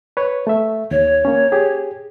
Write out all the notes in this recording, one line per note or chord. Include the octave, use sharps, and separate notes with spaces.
B4 C#5
A3 E5
D#2 C#5
A#3 C#4
G4 G#4